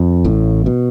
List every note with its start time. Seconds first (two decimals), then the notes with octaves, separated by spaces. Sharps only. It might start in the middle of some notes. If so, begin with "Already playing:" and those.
Already playing: F2
0.25 A1 A2
0.66 B2